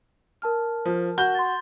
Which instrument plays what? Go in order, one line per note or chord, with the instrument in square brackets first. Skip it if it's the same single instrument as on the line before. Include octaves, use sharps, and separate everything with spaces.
[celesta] A#4 A5 F6
[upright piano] F3
F#4 G6 G7
[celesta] C6 A6